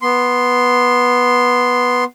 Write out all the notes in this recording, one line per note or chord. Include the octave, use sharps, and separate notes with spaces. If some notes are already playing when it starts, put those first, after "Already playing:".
B3 C6